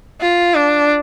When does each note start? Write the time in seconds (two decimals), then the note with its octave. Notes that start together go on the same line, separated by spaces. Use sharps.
0.21 F4
0.54 D4